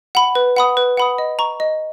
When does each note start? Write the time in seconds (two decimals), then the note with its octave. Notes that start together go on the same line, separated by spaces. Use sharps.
0.15 F#5 B5
0.35 B4
0.56 F#5 B5 D#6
0.77 B4
0.97 F#5 B5 D#6
1.18 D#5
1.39 A#5 C#6
1.60 D#5